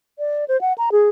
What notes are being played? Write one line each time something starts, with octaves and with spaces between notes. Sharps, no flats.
D5
C5
F#5
A#5
G#4